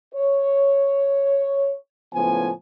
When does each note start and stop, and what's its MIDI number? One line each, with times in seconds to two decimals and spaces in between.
0.14 1.76 73
2.14 2.51 37
2.14 2.51 45
2.14 2.51 53
2.14 2.51 59
2.14 2.51 80